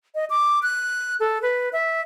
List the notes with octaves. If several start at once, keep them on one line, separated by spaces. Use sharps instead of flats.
D#5
D6
F#6
A4
B4
E5